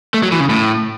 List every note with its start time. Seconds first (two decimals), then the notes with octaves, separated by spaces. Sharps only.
0.14 A3
0.23 F#3
0.32 E3
0.40 C#3
0.50 A2